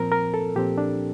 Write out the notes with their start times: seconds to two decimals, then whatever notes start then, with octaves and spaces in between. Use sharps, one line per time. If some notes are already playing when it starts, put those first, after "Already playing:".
Already playing: A#2 F3 C4 A#4
0.12 A#4
0.34 A4
0.55 A#2 F3 C4 G4
0.78 D4